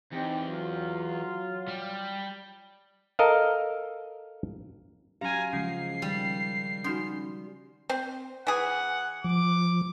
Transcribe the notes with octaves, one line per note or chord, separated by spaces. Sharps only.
E2 C4 D#4 G4
F#3 F4
G3
A4 A#4 D#5 F5
F#3 C#4 G4 F5 G#5 A#5
C#3 F3 G#3 C#4 C7
D#3 G3
C#4 D#4 F#4 C6
C4
E3 G#4 F#5
F3 D6